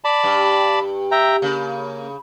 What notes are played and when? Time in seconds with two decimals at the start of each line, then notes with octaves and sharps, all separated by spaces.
0.04 D5 A5 B5
0.24 G2
1.11 E5 G5 A#5
1.42 C#3 A#3